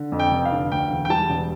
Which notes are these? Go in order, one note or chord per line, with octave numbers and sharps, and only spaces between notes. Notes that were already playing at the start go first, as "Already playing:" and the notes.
Already playing: D3
F2
G5
F1
F5
D3
D2 G5
E1
G5
G3 A5
E1